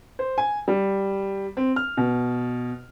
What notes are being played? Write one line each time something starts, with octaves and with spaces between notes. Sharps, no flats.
C5
G#5
G3
C4
F6
B2